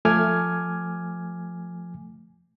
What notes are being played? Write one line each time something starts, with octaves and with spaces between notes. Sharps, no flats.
F3 A3 G#5 D6 F6 G#6